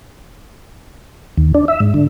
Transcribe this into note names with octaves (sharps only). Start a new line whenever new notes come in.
D#2
D4
E5
G#2
D3